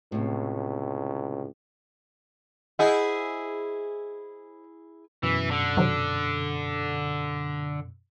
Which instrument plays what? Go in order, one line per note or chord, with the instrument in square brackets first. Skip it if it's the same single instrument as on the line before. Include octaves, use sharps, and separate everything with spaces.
[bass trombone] C#2 [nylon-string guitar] A2 C3
[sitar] E4 G#4 [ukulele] C5 D#5 F#5
[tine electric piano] F#2 B2 [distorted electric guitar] E3
[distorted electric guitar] D3
[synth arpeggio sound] C3 D#3 F#3